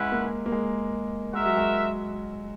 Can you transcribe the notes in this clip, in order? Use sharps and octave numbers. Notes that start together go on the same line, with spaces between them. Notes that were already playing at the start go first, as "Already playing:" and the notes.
Already playing: G#3 C#4 E4 B4 F#5
A#3
A#3
G#3
G#3 F#4 A#4 E5
F#3
G#3